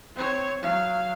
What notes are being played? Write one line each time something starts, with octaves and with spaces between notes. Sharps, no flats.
C4 C#5
F#3 F5